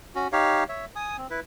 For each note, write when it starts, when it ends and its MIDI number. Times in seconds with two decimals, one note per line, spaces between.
0.15 0.28 61
0.15 0.28 66
0.32 0.64 63
0.32 0.64 67
0.32 0.64 73
0.32 0.64 77
0.69 0.85 73
0.69 0.85 76
0.96 1.17 80
0.96 1.17 87
1.18 1.27 60
1.30 1.40 64
1.30 1.40 71